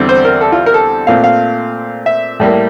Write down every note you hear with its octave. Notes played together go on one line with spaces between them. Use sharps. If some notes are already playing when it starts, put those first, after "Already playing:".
Already playing: E2 D3 G3 C4
C5
A#4
A4
F4
A#4
A4
A#2 A3 C4 F5
F5
E5
A2 G3 A#3